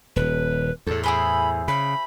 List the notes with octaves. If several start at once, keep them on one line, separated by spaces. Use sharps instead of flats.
D#1 B4
E2 A2 A4
E4 G#4 C5 B5
C#3 B5